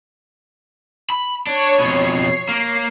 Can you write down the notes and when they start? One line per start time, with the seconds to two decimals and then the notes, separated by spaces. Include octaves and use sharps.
1.10 B5
1.47 D4 C#5
1.80 F2 B2 C7
2.49 A#3